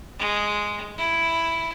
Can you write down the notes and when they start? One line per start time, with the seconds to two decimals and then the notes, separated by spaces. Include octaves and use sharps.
0.19 G#3
0.98 E4